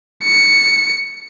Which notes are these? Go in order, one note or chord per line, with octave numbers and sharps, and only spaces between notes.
C#7